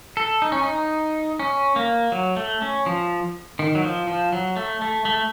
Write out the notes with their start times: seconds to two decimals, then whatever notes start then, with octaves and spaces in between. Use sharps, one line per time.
0.17 A4
0.42 D#4
0.52 C#4
0.63 D#4
1.39 C#4
1.76 A#3
2.12 F#3
2.36 A3
2.62 C#4
2.86 F3
3.59 D#3
3.75 F#3
3.84 F3
4.08 F3
4.33 F#3
4.56 A3
4.82 A3
5.05 A3